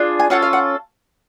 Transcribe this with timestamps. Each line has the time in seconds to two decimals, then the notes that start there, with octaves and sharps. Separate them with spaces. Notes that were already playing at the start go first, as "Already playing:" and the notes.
Already playing: D4 F4 G#4
0.20 G#5
0.30 C#4 F4 A4 F#5
0.42 F5
0.53 F#5